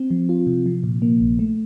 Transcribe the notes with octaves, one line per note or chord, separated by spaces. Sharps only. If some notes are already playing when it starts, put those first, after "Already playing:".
Already playing: C4
F3
F4
C3
F3
A#2
A#3
A#1
A3